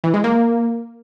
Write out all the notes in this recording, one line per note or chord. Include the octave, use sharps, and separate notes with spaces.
E3
G#3
A#3